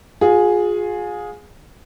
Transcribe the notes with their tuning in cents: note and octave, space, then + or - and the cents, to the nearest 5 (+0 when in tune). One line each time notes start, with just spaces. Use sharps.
F4 +40 G#4 +0